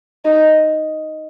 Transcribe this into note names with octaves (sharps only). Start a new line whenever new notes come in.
D#4